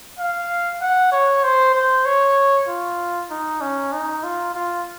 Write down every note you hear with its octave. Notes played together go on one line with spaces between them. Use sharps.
F5
F#5
C#5
C5
C5
C#5
F4
D#4
C#4
D#4
F4
F4